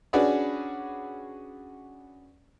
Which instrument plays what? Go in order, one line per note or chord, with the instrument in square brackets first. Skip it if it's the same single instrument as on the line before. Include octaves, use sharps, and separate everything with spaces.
[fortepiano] C#4 D4 F#4 G#4 B4 D5